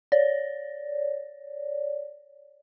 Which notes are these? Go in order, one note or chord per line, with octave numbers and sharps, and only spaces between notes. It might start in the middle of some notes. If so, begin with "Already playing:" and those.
C#5 D5